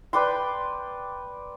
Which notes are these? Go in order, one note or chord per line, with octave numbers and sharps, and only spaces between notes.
B4 D5 G5 C6